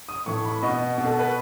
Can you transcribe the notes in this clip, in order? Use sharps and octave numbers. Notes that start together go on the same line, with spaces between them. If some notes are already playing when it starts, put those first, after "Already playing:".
D#6
A2 E3 C#6
B5
B2 D#5
B2
A4
B4